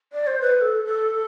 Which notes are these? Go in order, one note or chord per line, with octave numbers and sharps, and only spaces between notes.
D5
C5
B4
B4
A4
A4